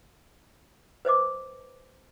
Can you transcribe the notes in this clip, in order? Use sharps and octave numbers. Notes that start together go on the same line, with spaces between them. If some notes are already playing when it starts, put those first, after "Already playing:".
B4 C5 D#5 D6